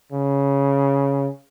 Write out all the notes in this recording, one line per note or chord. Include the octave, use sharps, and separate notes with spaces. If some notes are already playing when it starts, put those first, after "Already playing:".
C#3